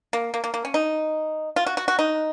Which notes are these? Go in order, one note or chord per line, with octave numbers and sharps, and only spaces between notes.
A#3
A#3
A#3
A#3
C#4
D#4
F4
F#4
F#4
F#4
D#4